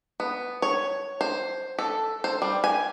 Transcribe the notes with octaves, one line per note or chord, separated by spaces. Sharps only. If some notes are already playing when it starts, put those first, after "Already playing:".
B3
C#5
C5
A4
C5
G3
G#5